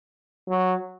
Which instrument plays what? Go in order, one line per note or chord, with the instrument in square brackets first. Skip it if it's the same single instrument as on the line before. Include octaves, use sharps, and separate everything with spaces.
[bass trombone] F#3